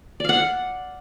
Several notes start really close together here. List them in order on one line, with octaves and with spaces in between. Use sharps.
D5 F5 F#5